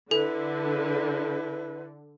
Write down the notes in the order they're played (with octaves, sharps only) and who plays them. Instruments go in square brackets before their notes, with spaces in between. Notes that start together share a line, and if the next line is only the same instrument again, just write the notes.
[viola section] D3 [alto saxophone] E4 [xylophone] A4 [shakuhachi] B4